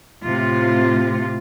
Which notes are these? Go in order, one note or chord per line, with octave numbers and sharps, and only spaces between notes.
A2 C3 F4